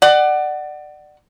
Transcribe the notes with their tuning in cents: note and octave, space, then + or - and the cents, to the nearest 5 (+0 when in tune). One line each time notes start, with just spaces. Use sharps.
D5 +25 F#5 +20